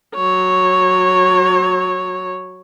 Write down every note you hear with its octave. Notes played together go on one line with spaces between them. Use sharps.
F#3 C#5